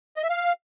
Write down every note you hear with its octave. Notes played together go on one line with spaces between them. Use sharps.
D#5
E5
F5